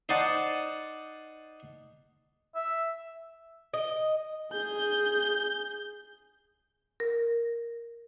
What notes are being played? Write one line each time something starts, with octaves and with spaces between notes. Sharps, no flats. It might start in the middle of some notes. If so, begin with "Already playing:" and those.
D#4 C5 D5 D#5 F#5 A5
E5
D#5
G#4 G6
A#4